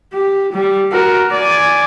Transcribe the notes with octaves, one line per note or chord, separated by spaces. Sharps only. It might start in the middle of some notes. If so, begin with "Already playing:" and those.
G4
G3
F#4 A#4
D5 G#5